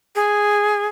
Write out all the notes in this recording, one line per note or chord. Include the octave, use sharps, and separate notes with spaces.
G#4